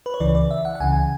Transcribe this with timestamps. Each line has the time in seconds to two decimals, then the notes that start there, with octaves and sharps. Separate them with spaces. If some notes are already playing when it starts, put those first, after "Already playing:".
0.06 B4
0.14 C#5
0.20 C#2 C#3 E3 D5
0.35 D5
0.51 E5
0.65 F#5
0.75 F#5
0.80 C#2 C#3 E3 G#5